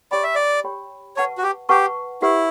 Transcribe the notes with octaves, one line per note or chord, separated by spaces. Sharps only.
G4 C#5 D5 G5 B5
E5
D5
G4 C#5 G5 B5
B4 C#5 F#5 A5 C#6
F#4
G4
G4 B4 F#5 A5 C#6
E4 G4 B4 F#5